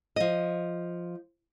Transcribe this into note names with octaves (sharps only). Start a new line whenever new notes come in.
F3 D#5